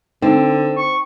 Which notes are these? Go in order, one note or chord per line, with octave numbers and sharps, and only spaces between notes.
D3 C4 D#4
C#6